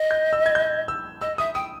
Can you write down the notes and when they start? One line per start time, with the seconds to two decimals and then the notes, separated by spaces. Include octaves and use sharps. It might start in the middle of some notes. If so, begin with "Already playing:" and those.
Already playing: D#5
0.11 G6
0.33 E6
0.46 G#6
0.55 G6
0.88 E6
1.21 D#5 E6
1.38 E5 D#6
1.54 G5 D#6